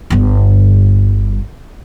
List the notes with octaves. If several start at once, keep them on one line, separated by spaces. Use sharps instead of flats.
G1 G2